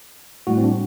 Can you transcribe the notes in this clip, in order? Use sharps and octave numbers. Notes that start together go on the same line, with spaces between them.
A2 G3 F#4
C4
D4